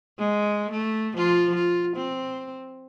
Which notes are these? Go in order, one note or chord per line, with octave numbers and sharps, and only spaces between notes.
G#3
A3
F3 F4
F4
C4